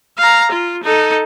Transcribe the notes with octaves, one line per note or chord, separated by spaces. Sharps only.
F5 A#5
F4
D#4 A4